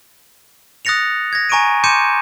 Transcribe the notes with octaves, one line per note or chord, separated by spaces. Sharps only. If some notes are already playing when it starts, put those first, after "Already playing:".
D#6 F#6 A6 A#6 C#7 F7
G#6 A#6
G#5 A#5 C#6 A#6 D7 D#7
C6 D6 G6 C#7 D#7 E7